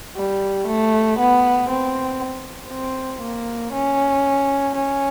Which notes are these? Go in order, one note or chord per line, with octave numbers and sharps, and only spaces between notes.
G3
A3
B3
C4
C4
A#3
C#4
C#4